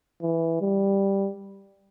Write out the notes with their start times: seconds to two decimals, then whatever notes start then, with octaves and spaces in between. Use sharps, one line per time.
0.22 E3
0.61 G3